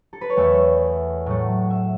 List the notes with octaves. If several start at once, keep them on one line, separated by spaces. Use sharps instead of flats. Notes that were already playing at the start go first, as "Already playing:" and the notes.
A4
B4
C#5
E2 E3 A3 E5
A2 F#3 A3
E5